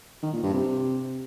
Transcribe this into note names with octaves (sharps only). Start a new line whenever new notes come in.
D#3
A#2
G2
C3